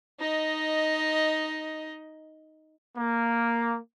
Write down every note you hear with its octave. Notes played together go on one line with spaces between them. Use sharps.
D#4 D#5
A#3